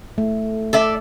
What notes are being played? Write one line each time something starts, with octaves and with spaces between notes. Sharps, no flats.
A3
A4 D5 E5